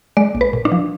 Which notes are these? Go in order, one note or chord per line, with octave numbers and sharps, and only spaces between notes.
G#3 D5
A#1
B4
A#2
D4
F3